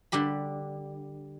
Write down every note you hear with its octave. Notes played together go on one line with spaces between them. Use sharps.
D3 G3 G4 B5